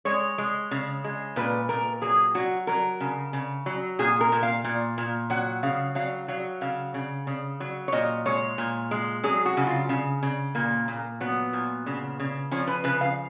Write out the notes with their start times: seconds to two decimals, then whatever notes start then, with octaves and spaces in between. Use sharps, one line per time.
0.05 G#3 C#5
0.38 G#3
0.71 C#3
1.04 G#3
1.36 A#2 B4
1.69 A#2 A#4
2.02 F#3 G#4
2.35 F#3 F#4
2.67 F#3 A#4
3.00 C#3
3.33 C#3
3.66 F#3
3.99 A#2 G#4
4.21 A#4
4.32 A#2
4.43 F5
4.64 A#2
4.98 A#2
5.30 F#3 F#5
5.63 C#3 F5
5.95 F#3 F5
6.28 F#3 F5
6.61 C#3 F5
6.94 C#3
7.27 C#3
7.60 F#3
7.88 C#5
7.92 A#2 D#5
8.26 G#3 C#5
8.58 A#2
8.91 G#3
9.24 F#3 G#4
9.46 F#4
9.57 C#3
9.67 F4
9.89 C#3
10.23 C#3
10.55 A#2 A#3
10.88 A#2
11.20 F#3 B3
11.53 A#2
11.86 C#3
12.20 C#3
12.51 F3 C#4
12.68 B4
12.84 C#3 B4
13.01 F5